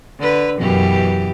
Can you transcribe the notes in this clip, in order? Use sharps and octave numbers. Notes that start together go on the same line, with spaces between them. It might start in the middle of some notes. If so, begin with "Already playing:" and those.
D3 B4
F#2 B2 E3 G4